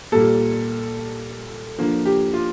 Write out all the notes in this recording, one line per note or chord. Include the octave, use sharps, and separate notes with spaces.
A#2 G3 A#3 A4
D3 F3 A#3
G4
F4